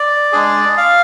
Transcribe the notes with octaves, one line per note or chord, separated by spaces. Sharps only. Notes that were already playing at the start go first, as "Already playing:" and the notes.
Already playing: D5
G#3 D4 G#4
F5